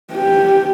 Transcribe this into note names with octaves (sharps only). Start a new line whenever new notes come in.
G4